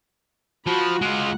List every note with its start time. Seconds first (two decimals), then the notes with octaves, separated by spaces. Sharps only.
0.66 F3 F#4 B5
1.01 G#3 F4 F#5